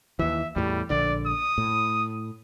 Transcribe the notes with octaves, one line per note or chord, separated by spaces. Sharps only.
D#2 E3 E5
E2 A2 G3
A#1 D3 D5
D#6
A2